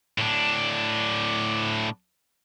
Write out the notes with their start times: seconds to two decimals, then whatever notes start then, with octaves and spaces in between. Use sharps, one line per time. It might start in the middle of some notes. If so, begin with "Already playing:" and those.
0.18 A2 D4